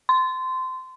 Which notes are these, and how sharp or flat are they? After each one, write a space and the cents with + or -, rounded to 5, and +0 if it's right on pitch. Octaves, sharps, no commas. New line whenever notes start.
C6 -20